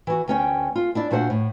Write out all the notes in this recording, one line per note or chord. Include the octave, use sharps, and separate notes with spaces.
E3 F#4
D2 C#4 G5
F4
D4 E4 D5
A#2 A3 D4 F#4 C5 F#5
A2